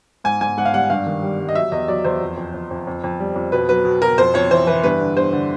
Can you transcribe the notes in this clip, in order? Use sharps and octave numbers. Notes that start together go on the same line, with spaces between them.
G#2 G#5
G#2 G#5
G#2 F#5
F5
G3 F#5
G2 F5
D#3
G3
G3
D#5
F#3 E5
E2 D#5
F#3 D5
E2 C5
F2
F2
F2
F2
F2
F2
G3
F2
B2 B4
F#3 B4
B2
B2 A#4
F2 C5
F2 C#5
E3 C5
E3 B4
G2 B4
D3
G2 C5
D3